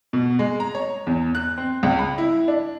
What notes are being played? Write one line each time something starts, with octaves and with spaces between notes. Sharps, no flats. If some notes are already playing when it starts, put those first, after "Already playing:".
B2
G#3
A#5
C#5
E2
F#6
C4
C#2
B5
E4
D4